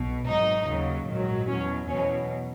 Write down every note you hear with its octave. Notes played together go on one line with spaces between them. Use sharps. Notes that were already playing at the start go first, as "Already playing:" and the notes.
Already playing: B1 B2
G#1 G#2 F#3 D#4
D#2 C#3 F#3
A#1 G#2 D#3 F#3
E2 B2 F#3 C#4
E2 B2 F#3 C#4